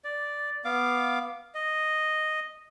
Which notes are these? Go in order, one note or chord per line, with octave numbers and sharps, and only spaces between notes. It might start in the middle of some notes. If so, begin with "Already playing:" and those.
D5
B3 F5 D6
D#5